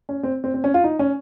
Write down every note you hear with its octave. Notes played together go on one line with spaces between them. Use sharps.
C#4
C4
C4
C4
C#4
F4
D#4
C#4